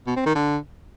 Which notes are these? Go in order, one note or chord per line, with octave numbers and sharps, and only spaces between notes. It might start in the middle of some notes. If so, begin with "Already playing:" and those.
B2
C4
D#3
D3